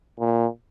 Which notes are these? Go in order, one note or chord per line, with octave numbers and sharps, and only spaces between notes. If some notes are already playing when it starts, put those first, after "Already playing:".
A#2